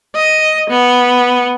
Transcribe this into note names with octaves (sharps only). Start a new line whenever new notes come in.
D#5
B3